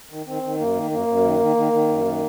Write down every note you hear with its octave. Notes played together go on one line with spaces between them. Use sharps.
D#3
D#3 C4
D#3
F#2 A#3
D#3
F#2 A#3
F#2
D#3
D#3
D#3
D#3
F#2
D#3